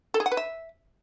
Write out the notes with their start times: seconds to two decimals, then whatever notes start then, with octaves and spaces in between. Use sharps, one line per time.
0.14 A4
0.20 G#4
0.26 F#5
0.32 B4
0.37 E5